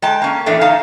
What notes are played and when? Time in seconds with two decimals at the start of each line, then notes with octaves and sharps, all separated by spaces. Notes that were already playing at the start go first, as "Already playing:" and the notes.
0.02 G#3 G5 A5
0.22 A#3 C#4
0.46 E2 A2 E3 A3 D4 D#5
0.61 D#4 C#5 F5 A5